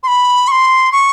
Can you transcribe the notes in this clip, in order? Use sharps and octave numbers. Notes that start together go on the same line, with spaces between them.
C6
B5
C#6
C6
C#6